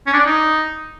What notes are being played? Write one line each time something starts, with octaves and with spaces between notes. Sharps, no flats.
C#4
D4
D5
D#4